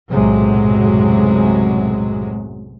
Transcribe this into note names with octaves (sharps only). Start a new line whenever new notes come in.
B1 F#2 A2 C3 F#3 G#3